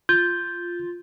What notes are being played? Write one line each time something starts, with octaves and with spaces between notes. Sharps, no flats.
F4 G6